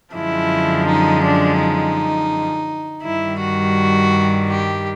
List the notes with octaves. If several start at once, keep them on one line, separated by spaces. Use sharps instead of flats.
F#2 D3 F3 G#3 E4
D#4
D4
D#4
G2 D#3 G3 E4
F#4
G4